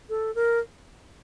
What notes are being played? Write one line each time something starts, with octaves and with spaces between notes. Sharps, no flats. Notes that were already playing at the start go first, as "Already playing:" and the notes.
A4
A#4